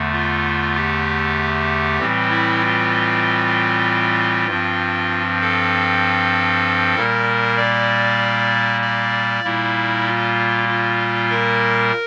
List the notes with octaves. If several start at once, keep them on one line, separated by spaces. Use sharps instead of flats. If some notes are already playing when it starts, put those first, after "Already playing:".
Already playing: E2 D3 A3
F4
G4
A2 E3 G3 C4
E4
F4
G2 F3 C4
A4
A#2 G3 A#3 A#4
D5
D5
A#2 G3 A#3 E4
F4
F4
A#4